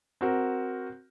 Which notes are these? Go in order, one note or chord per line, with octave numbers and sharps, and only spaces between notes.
C4 F#4 A#4